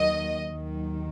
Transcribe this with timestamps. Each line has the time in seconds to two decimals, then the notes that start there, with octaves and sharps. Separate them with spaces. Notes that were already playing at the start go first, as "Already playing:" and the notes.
Already playing: D#2 D#3 F#3 D#5
0.48 D#2 D#3 F#3